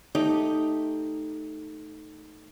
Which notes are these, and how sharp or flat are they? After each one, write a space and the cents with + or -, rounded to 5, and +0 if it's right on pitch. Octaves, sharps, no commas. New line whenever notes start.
A3 +0 D#4 +0 G4 +5